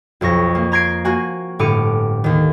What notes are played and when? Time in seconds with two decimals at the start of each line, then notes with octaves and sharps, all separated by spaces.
0.21 B1 F2 C#6 A#6
0.55 A#3
0.72 A#5 C6 G#6 A#6 C7 D7
1.05 A#3 F#4 G#5
1.59 G1 A2 D6 F6 C#7 D#7
2.24 D#2 D#3